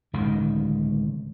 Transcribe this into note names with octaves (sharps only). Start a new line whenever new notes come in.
D1 C#2 D#3